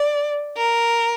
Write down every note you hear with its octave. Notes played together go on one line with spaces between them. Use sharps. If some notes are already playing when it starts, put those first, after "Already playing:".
Already playing: D5
A#4